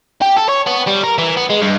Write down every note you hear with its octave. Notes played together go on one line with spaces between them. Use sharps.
G4
A4
C#5
B3
G3
A#4
E3
B3
G#3
G2